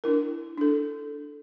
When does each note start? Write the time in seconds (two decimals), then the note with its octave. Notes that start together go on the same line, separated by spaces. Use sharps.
0.04 D4 E4 A#4
0.58 D4 A4